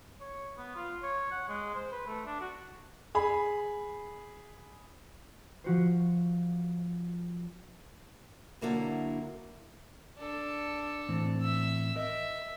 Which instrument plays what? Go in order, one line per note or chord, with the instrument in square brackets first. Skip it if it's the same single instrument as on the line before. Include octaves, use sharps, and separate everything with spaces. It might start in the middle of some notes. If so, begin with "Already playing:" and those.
[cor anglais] C#5
B3
F4
C#5
F#5
G#3
C5
B4
A3
D4
F#4
[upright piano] G#4 B5
[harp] F3 F#4 C5
[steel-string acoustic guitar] D3 F#3 A#3 E4
[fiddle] D4 A4
[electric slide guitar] A2 E3 C4
[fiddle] E5 E6
[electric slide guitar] A#4 D#5 [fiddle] E5